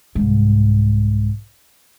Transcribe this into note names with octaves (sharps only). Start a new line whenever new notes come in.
C2 G#2